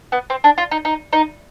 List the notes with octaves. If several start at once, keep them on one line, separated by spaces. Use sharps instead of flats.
B3
C4
D4
F4
D#4
D#4
D#4